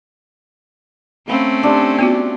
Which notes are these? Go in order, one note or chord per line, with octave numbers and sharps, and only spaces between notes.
A3 C4 C#4 F5 B5
D4 G4 C6
B3 F4 F#4